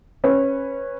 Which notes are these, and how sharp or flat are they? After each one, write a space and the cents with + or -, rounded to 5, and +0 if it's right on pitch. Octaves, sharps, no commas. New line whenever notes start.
C#4 -15 B4 +0